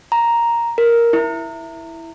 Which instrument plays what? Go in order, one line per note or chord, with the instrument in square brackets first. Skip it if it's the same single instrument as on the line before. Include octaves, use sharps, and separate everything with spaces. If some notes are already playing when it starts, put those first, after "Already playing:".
[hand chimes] A#5
A#4
E4